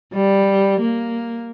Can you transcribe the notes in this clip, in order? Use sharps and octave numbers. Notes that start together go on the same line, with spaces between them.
G3
A#3